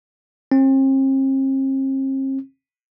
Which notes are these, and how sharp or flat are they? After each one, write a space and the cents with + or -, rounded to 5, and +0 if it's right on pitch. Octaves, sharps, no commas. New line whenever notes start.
C4 +40